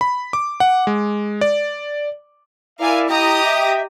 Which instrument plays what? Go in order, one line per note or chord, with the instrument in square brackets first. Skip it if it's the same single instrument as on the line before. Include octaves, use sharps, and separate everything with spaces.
[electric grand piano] B5
D6
F#5
G#3
D5
[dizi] E4 [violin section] A#4 F5 G#5 [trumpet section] D5 E5
[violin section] G4 A#5 D#6 [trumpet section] D#5 G5
[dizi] E5